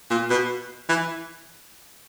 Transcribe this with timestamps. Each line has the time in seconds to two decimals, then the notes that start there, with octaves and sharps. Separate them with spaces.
0.10 A#2
0.30 B2
0.89 E3